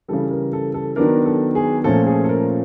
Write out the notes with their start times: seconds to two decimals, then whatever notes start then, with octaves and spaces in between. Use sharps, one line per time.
0.08 C#3 E3 G3 A4
0.31 A#4
0.53 A4
0.74 A4
0.96 D#3 F#3 B3 D4 A#4
1.26 A4
1.55 G#4
1.84 A#2 F3 A3 C#4 A4
2.06 G#4
2.24 A4
2.29 A#4